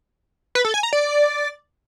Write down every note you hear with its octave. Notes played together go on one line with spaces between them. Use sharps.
B4
A4
G#5
A#5
D5